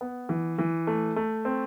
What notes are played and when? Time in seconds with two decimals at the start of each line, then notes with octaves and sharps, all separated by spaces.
0.01 B3
0.29 E3
0.59 E3
0.87 A3
1.16 A3
1.45 C4